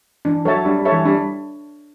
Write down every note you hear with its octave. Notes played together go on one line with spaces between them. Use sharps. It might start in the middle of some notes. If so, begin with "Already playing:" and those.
E3 D4
F#3 A4 C#5 E5 A5
G3 D4
G3
A4 C#5 E5 A5
E3
G3 D4